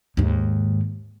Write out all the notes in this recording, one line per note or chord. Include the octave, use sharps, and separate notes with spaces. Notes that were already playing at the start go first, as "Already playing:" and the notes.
D#2 G#2